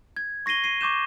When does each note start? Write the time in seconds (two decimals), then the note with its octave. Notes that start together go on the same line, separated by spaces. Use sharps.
0.17 G#6
0.46 C#6 A#6 C7 D#7 G7
0.64 C7 D#7
0.81 C#6 D6 G6 E7